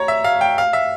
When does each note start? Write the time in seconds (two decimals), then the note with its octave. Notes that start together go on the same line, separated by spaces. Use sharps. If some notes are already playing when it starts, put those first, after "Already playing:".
Already playing: C#5 A#5
0.08 E5
0.24 F5
0.41 G5
0.58 F5
0.73 E5